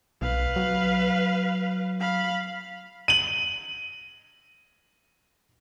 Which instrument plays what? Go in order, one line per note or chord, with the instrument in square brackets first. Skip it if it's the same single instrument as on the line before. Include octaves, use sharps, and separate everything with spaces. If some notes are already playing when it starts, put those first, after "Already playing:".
[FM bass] B1 [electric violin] B4 F5
[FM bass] F#3
[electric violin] F5 B5
[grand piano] D#7 F#7